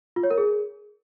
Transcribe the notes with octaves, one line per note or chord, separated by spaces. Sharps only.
F4
C#5
A#4
G#4